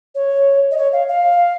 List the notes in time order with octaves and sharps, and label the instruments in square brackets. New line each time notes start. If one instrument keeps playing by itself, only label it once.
[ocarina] C#5
D#5
C#5
F5
F5